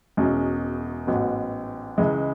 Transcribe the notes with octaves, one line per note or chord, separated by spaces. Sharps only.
E1 E2 B2 G#3 C#4
A1 G#2 F#3 B3
C#2 C#3 E3 G#3